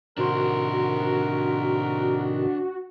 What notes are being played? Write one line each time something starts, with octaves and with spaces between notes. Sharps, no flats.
A2 C3 D#3 D4 F#4 A#4 C5